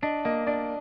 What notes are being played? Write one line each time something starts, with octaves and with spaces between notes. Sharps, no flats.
D4 D#5
A#3 D#5
D4 D5